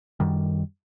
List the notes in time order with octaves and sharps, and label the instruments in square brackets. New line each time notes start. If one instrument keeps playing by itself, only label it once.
[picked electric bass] F#2 D#3 G3